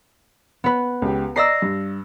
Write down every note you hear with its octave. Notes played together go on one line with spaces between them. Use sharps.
B3 B4
C#2 G4
D5 D#5 A#5 E6 A#6 C7
G2